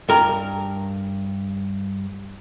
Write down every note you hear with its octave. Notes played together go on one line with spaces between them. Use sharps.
G2 A#4